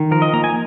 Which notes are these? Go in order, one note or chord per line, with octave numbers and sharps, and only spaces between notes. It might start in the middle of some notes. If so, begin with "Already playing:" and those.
Already playing: D#3
F3 A#4
D#5
A#3 A#5
G#5